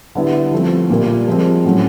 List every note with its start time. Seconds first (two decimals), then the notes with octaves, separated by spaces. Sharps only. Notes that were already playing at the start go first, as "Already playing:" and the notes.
0.15 D3 G3 B3 E4
0.52 F3 A3 C4
0.90 A#2 G3 A#3
1.27 F3 G#3 C4
1.65 A2 F#3 A3 C#4